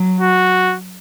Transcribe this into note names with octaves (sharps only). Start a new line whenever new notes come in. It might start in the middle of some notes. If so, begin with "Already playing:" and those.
Already playing: F#3
F#4